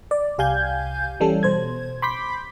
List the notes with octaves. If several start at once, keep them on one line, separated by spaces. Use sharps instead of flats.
D5
C2 G4 F5 G#5 G6 G#6
E3 G3 C#4 A4
B2 C5 G#6
B5 C6 D6 G6 B6